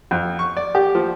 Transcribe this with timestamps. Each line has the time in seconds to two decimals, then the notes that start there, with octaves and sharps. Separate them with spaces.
0.11 F2
0.39 C#6
0.57 D5
0.75 G4
0.95 F3